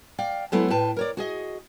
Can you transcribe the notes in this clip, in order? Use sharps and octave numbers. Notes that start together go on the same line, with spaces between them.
D5 F5 G5
F#3 G#3 A3 B3 E4 A4
A2 B4 G5 A5
A#4 C#5 D5
F#4 G#4 D#5